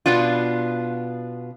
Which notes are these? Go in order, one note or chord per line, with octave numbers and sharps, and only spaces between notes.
B2 B3 D4 F4